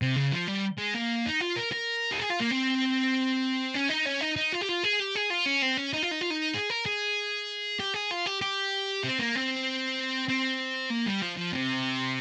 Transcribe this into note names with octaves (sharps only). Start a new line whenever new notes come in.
C3
C#3
F3
G3
G#3
A#3
D#4
F4
A#4
A#4
G4
G#4
F4
A#3
C4
C#4
D#4
C#4
D#4
D#4
F4
G4
F4
G#4
G4
G#4
F4
C#4
C4
C#4
D#4
F4
D#4
F4
D#4
G#4
A#4
G#4
G4
G#4
F4
G4
G4
C4
A#3
C4
C4
A#3
G3
F3
F3
C3